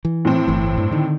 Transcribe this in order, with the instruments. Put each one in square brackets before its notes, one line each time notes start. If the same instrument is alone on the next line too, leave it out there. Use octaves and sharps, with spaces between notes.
[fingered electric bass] E3
[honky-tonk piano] A2 C4
[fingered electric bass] G1 E3
G2
D3 D#3